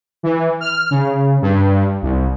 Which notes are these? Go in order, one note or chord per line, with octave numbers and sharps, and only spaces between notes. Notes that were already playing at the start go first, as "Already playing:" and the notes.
E3
F6
C#3
G2
C2